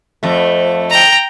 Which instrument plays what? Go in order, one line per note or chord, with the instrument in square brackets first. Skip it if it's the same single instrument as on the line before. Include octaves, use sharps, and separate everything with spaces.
[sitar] F2 A3
[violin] G5 A#5